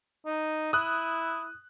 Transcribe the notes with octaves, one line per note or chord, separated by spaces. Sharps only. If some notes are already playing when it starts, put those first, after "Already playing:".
D#4
E4 D#6 F#6